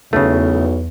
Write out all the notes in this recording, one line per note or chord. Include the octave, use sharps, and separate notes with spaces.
B1 E2 C#3 A3